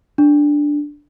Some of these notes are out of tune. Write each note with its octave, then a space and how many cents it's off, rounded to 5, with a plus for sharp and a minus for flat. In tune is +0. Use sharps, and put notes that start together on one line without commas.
D4 +0